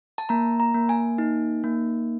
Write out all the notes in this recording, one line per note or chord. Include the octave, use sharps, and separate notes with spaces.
A5
A#3 A#5
A#5
A#3
G#5
D#4
A#3